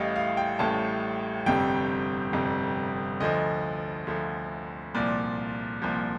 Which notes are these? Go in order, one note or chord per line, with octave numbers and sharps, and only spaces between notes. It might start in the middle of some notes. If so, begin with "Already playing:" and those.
Already playing: A1 A2 G3 D#5 F5 G5
F5
G5
A1 A2 G3 A5
G1 F2 C3 G3 G5
G1 F2 C3 G3
D2 D3 F3 D#5
D2 D3 F3
C2 A#2 F3 D5
C2 A#2 F3